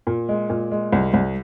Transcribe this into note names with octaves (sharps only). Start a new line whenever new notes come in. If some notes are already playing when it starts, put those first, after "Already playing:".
A#2
G#3
A#2
G#3
C2
C2